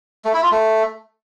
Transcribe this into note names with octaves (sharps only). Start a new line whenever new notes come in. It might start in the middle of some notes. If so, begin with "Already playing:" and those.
A3
E4
F4
A3